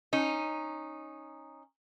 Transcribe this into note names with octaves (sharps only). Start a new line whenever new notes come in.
C#4 D#4